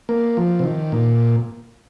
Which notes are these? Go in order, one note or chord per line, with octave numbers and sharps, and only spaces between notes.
A#3
F3
C3
D#3
A#2